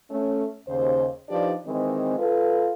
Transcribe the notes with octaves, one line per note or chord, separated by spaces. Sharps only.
A3 C#4
D#2 C#3 C5
F3 D4 D#4 G4 B4 D5
D#3 E3 G#3 C4
F4 A4 B4